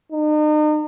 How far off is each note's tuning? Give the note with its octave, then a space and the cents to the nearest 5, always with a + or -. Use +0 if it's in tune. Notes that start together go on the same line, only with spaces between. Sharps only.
D#4 -40